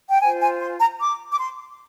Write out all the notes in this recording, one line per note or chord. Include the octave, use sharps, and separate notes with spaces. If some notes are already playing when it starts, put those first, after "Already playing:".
G5
F4 C5 G#5
G#5
C6
A#5
D6
D6
C6